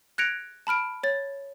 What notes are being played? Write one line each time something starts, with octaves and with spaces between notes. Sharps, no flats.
F#6 G#6 A#6 C#7 D7 F7
A5 B5 F6 D7
C#5 A6